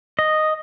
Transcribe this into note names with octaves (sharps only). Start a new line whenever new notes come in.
D#5